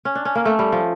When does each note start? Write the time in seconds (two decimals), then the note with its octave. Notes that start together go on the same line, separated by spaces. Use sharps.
0.05 C#4
0.15 D4
0.25 C#4
0.35 A#3
0.45 A3
0.59 G3
0.72 F3